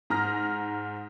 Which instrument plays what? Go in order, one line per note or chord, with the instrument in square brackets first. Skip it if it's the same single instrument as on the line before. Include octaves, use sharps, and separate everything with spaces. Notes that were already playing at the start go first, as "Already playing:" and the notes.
[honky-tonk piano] G#2 A#5 F6 A#6